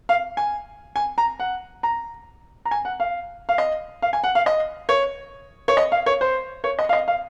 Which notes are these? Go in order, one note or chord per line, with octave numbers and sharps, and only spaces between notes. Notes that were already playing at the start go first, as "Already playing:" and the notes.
F5
G#5
G#5
A#5
F#5
A#5
A#5
G#5
F#5
F5
F5
D#5
F5
G#5
F#5
F5
D#5
C#5
C#5
D#5
F5
C#5
C5
C#5
D#5
F5
D#5
F5